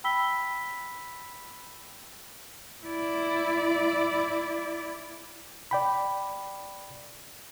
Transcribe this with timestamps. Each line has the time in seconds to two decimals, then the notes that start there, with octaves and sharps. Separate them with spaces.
0.04 G5 B5 E6 B6 G7
2.85 E4 D5
5.71 D5 G5 B5